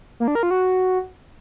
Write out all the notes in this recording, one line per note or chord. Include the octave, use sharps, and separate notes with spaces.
A#3
D4
A#4
F4
F#4